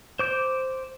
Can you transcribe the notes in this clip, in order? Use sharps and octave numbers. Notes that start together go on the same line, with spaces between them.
C5 D6 G6